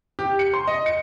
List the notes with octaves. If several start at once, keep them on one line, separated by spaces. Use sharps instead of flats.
G4
C#7
C6
D#5
C#7